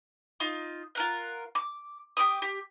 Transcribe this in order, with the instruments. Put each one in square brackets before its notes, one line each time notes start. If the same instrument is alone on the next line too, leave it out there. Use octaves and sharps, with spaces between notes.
[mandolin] D#4 F4
F4 A#4 F#5
D6
G4 G5 D6 D#6
G4